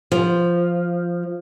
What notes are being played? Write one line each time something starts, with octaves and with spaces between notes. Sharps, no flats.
F3